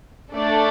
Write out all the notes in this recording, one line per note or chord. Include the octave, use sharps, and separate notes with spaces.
A3 D4 A4 D5